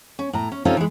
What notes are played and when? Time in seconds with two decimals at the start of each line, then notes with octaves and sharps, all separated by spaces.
0.19 C#4
0.33 A2 A#5
0.52 C#4
0.65 C3 C4 C#4 D#4 F4 A4
0.77 E3 G#3